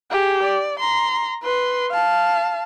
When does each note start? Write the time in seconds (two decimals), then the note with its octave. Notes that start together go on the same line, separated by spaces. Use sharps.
0.11 G4 G#4
0.43 D5
0.80 A#5 C6
1.43 B4 C6
1.91 F5 A5